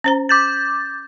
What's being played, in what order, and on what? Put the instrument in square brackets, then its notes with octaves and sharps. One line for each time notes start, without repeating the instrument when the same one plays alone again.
[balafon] C#4 C5 A#5
[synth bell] D6 G6 A6